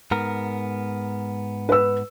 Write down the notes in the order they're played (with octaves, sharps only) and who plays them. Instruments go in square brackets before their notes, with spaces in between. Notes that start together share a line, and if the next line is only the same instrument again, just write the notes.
[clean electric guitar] G#2 B3 A#4
[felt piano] B4 E6